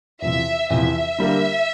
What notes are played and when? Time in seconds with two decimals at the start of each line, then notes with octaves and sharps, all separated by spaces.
0.22 E2 C3 F3 E5
0.70 E2 C3 F3 E5
1.18 D3 G3 A#3